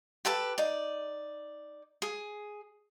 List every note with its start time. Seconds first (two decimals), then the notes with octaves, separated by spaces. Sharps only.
0.25 G4 A4 B4 A5
0.58 D#4 D5
2.02 G#4